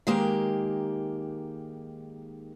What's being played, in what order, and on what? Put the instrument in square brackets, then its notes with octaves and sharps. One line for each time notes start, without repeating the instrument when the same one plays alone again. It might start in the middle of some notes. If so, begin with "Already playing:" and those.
[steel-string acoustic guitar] D#3 G#3 A#3 G4